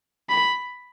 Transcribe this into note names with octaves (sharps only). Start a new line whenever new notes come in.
B5